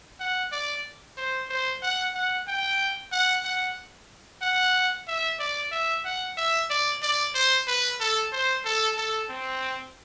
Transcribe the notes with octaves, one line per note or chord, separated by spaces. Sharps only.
F#5
D5
C5
C5
F#5
F#5
G5
F#5
F#5
F#5
E5
D5
E5
F#5
E5
D5
D5
C5
B4
A4
C5
A4
A4
C4